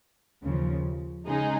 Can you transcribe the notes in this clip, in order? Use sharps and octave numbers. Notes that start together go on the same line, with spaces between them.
D#2 C#3 F3
C#3 G#3 D#4 G#4